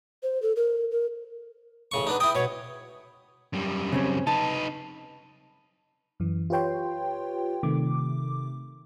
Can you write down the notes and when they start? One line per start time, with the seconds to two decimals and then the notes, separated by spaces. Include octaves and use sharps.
0.23 C5
0.42 A4
0.56 A#4
0.91 A#4
1.91 A1 C#3 C#6
2.07 B3 D4 D#4
2.20 E4 G5 D#6
2.35 B2 C#5
3.53 F#2 G3
3.92 C#3 C4 C#4
4.27 D#4 B4 A5
6.20 F#2 E3
6.50 F4 G4 B4 C#5 G5 C6
7.63 C3 D#3 A3 D6